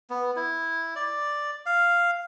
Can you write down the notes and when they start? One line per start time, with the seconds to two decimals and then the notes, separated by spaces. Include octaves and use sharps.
0.10 B3
0.36 E4
0.96 D5
1.66 F5